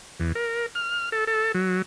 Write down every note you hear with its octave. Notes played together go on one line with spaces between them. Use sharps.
E2
A#4
F6
A4
A4
F#3